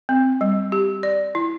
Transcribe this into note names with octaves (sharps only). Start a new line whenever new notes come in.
C4
G3
G4
D5
E4